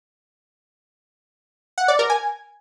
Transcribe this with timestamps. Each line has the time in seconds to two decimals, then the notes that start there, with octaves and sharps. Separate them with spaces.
1.78 F#5
1.88 D5
1.99 A#4
2.10 G#5